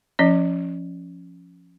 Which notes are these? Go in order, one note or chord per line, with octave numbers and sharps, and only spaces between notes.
F3 C#4 D#5